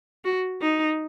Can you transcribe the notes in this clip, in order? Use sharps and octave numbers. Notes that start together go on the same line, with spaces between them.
F#4
D#4